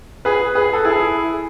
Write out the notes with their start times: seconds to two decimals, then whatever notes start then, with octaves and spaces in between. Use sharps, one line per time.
0.25 G#4 B4
0.55 G#4 B4
0.73 A4
0.85 E4 G#4